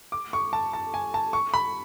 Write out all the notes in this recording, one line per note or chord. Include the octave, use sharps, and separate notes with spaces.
D6
C#6
A5
A5
G#5
A5
C#6
B5